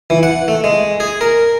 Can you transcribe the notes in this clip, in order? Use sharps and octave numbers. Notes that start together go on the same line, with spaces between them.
E3
F#5
A3
G#3
G#4
A#4